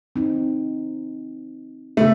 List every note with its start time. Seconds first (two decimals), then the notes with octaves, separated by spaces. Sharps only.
0.16 C4 D#4
1.97 C#3 A3 B3 E5